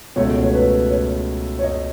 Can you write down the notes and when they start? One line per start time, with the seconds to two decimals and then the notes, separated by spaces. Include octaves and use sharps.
0.16 C#2 B2 A3 C#5
0.42 C#5
0.53 B4
0.90 C#5
1.59 C#5
1.64 D#5